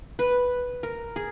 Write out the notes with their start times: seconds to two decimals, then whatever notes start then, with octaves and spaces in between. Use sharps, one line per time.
0.19 B4
0.83 A#4
1.16 G#4